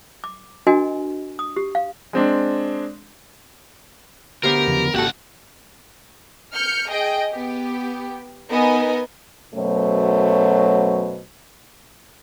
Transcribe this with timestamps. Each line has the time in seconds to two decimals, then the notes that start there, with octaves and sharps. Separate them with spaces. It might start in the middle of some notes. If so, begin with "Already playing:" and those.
0.24 D6
0.67 D4 F#4 A#4 D#5 G#5
1.39 D#6
1.56 G4
1.75 F5
2.13 G#3 C4 D4
4.43 D2 B3 G4 A#4 C5
4.67 E2 C#3 F3
4.94 G#1 C#2 A#3 F#4 G4 A4 F#5
6.54 F6 G6 C#7
6.89 G#4 D#5 G5
7.30 B3 G4
8.50 B3 D#4 A#4 D#5 G#5
9.55 F#2 B2 F#3 A3 C5 C#5